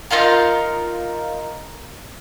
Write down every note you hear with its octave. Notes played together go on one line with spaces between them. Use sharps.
D#4 F4 A#4 F5